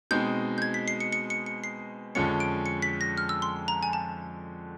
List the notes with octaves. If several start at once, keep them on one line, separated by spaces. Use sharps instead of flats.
B2 G#3 C4 D#4 G6
G6
G#6
B6
C7
C#7
C#7
C#7
C#7
C7
F2 D3 F3 G#3 C#4 C#7
D7
C#7
B6
A#6
F6
E6
C6
A#5
G#5
A5